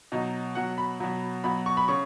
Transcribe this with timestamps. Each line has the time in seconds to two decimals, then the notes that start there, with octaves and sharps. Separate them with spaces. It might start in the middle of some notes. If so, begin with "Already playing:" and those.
0.12 B2 F#3 D#4
0.55 B2 F#3 F#5
0.78 B5
1.00 B2 F#3
1.44 B2 F#3 B5
1.66 C#6
1.77 B5
1.88 C#3 C#6